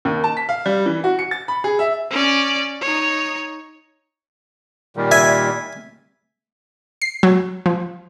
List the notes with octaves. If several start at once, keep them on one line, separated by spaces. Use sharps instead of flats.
D#2
A5
B6
F5
G3
E3
F#4
C#7
A6
B5
G#4
E5
C#4 D5
D#4 C#5
A#2 D#3 G3
E5 G#5
C7
F#3
F3